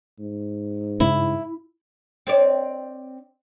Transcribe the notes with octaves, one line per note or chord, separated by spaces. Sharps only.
G#2
G2 C#3 G#3 E4
C4 C#5 D5